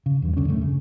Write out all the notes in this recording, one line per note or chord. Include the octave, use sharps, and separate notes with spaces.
C#3
E2 G2
E1 C2 D3 C#4
D#1 F#2 A3
C#3